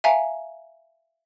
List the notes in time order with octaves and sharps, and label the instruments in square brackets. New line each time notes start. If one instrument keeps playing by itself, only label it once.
[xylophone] E5 F5 G#5 A#5